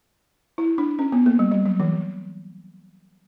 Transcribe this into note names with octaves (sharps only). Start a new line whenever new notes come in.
E4
D4
C#4
B3
A#3
G3
G3
F#3
E3